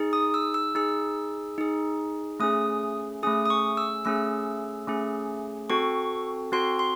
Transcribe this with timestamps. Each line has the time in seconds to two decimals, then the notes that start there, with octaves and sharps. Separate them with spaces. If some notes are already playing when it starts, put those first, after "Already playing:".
Already playing: D#4 G#4
0.13 D#6
0.34 E6
0.54 E6
0.75 D#4 G#4 E6
1.58 D#4 G#4
2.40 A3 C#4 G#4 D#6
3.23 A3 C#4 G#4 D#6
3.46 D#6
3.50 C#6
3.77 E6
4.05 A3 C#4 G#4 E6
4.88 A3 C#4 G#4
5.70 C4 F#4 A4 C#6
6.52 C4 F#4 A4 C6
6.79 C6